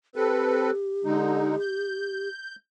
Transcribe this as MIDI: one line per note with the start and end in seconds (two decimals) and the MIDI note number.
0.16 0.71 60
0.16 2.28 67
0.16 0.71 69
0.16 0.71 71
1.05 1.56 50
1.05 1.56 56
1.05 1.56 63
1.61 2.56 91